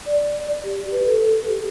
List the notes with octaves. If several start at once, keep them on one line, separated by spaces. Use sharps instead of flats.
D5
G4
B4
A4
G4